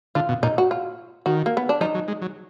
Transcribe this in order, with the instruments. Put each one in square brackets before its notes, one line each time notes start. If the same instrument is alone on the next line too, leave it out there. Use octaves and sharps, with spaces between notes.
[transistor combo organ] D3 [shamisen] F4
[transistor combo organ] B2
[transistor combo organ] A#2 [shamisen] D#4
[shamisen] F#4
F4
[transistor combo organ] D#3 [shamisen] F#4
[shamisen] A#3
B3
D4
[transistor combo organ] F3 [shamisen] D#4
[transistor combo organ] F#3
G#3
F#3